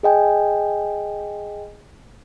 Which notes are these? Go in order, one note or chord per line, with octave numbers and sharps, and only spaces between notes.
G#4 D#5 G5 G#5